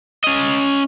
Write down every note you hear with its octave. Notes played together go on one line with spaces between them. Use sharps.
C#4 D#5